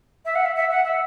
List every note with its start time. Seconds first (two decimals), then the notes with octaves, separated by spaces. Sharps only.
0.25 E5
0.35 F#5
0.45 E5
0.55 E5
0.70 F#5
0.84 E5